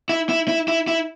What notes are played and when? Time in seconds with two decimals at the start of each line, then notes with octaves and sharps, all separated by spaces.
0.09 E4
0.29 E4
0.48 E4
0.68 E4
0.88 E4